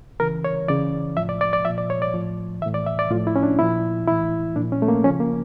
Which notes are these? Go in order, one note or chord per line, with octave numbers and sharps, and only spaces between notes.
C#3 E3 A#4
C#5
C#3 E3 D5
A2 F3 E5
D5
D5
D5
A#2 F3 E5
D5
C#5
D5
A2 F3
A2 E3 E5
D5
E5
D5
A2 F3 F4
E4
C#4
D4
A#2 F3 E4
A2 E3 E4
A#2 F3 D4
C#4
A3
A#3
C#3 F3 C#4
A#3